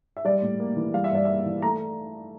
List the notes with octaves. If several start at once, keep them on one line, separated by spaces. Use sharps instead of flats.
E5
G3 D5
A2
A#3
E3
G3 F5
E5
G2 D5
A#3 E5
E3
A3 A#5